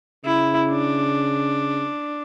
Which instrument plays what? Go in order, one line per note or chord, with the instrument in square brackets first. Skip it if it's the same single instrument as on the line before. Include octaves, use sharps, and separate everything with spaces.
[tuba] C#3 [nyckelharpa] E4
[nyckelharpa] D4